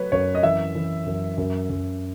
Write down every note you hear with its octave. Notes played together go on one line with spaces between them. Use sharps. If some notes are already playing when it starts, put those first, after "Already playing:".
Already playing: F#3 A3 B4 C#5
F#2 C#5
D#5
E3 E5
E3
F#2
F#2
F#2